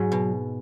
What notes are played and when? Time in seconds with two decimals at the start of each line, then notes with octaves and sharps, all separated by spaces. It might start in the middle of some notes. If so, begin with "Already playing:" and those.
Already playing: G#2 F#3
0.12 B2